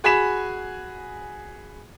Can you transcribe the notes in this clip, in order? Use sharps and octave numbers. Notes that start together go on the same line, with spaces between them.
F#4 G#4 G#5 B5 B6 E7